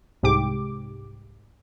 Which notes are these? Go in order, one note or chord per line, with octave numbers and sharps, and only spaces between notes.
C2 G#2 G4 D6